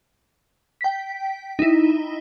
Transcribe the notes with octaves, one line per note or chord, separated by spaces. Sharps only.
G5 B6
D#4 E4